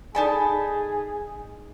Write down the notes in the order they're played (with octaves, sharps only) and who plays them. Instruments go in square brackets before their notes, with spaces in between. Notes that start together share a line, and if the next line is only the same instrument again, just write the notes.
[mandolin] D#4 A5 B5 [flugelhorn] G#4 [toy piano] A4 D5 G#5